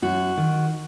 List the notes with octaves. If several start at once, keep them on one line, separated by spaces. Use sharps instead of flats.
F#2 F#4
D#3